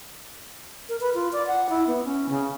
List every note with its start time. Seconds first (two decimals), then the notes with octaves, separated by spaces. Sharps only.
0.89 A#4
1.01 B4
1.14 F4
1.33 D5
1.47 F#5
1.70 E4
1.87 B3
2.04 C#4
2.29 C#3